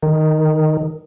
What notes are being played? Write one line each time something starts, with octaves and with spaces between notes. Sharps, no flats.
D#3